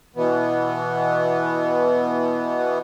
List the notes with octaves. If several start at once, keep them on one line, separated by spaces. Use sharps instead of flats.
B2 E3 B3